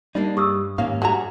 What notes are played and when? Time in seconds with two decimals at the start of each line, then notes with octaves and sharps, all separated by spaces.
0.15 G3 A#3 D4 D#4
0.37 G2 G4 D#6 E6
0.78 D#2 G#2 A#3 C#4 F5
1.02 D3 G3 F#4 G#4 A#5